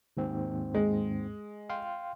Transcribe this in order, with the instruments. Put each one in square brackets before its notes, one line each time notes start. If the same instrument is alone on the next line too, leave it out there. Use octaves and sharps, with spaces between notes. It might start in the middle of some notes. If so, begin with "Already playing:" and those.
[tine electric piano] D#2 G#2 C4
[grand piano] G#3
[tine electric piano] F5 G5 C6